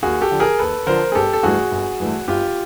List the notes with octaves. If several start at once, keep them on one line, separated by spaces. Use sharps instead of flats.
D#2 F#4 G#4
G4 A4
D3 F3
G#4 A#4
D#2 A4 B4
D3 F3 A#4 C5
G#4
G1 G4 A4
A4
G2 E3 A3 F#4 G#4
G1
G2 E3 A3
G1 F4 G4